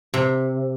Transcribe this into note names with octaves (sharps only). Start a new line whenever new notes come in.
C3